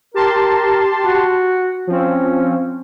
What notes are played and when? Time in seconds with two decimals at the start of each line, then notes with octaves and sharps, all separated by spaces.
0.14 G4 A#4 A5 C6
1.03 F#4
1.87 F3 C4 C#4